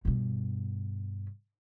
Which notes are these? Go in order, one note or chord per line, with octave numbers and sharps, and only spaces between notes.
G2 B2